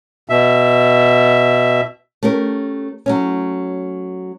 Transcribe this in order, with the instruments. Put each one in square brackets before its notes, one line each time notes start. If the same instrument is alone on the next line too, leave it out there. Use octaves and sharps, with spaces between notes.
[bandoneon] B2 E5
[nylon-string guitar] A3 C#4 G4 A#4
F#3 A3 C#4